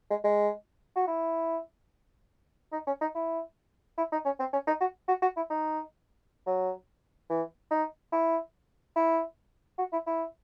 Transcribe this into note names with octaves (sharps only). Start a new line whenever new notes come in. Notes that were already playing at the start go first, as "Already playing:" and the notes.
G#3
G#3
F#4
E4
D#4
C#4
D#4
E4
E4
D#4
C#4
C4
C#4
D#4
F#4
F#4
F#4
E4
D#4
F#3
E3
D#4
E4
E4
F#4
E4
E4